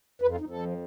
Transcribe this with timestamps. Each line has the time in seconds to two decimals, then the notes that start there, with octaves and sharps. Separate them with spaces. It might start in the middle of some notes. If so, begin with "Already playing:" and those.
0.22 F2 B4
0.31 F4
0.40 F2 D#4
0.50 A4
0.59 F3